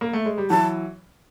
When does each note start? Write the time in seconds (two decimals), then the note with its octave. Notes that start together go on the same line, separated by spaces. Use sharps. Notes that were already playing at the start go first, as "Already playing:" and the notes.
0.01 A#3
0.13 A3
0.26 G#3
0.38 G3
0.50 E3 F#3 A5